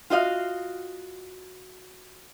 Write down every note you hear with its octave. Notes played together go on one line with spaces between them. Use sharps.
F4 F#4 D#5 F5